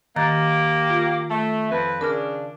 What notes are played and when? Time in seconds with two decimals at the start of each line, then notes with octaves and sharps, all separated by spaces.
0.16 D#3 A#3 G4 A#5 A6
0.90 F4
1.30 A3
1.70 F2 B4
2.01 C#3 D4 A#4 F6